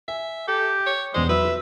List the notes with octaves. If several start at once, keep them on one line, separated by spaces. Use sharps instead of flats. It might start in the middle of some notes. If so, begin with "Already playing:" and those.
E5 G#5
G4 A4
C#5
E1 E2 G#3 C5 D5
F#3 B4 E5
F#4